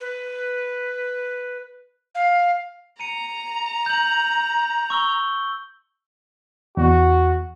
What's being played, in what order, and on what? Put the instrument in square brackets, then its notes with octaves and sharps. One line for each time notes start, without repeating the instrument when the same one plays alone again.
[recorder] B4
F5
[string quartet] A#5 [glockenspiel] C#7 D#7
[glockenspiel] G6 F#7
C#6 E6 G7
[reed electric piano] E2 [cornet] F#4